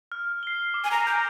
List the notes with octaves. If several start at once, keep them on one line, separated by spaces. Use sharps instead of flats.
F6
C7 G7
D6
G#5
A#5
A#5 G6 D7